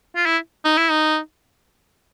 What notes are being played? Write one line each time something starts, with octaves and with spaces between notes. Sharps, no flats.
F4
E4
D#4
E4
D#4